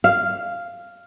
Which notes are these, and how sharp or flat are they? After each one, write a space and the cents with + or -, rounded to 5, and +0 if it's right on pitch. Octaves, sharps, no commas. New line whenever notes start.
F5 -5